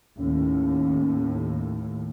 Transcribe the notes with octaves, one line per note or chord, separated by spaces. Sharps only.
D#2 A2 C#4